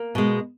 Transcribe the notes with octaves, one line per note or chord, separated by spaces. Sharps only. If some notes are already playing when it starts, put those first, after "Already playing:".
Already playing: A#3
B2 G#3